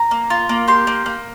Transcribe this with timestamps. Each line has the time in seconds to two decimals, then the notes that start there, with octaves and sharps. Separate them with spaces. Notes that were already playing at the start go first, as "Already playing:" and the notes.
Already playing: A#5
0.11 A#3
0.30 F4
0.49 A#3
0.68 G4 C6
0.87 A#3
1.06 A#3